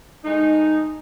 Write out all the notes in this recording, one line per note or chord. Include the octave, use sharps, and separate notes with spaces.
G#3 A3 D#4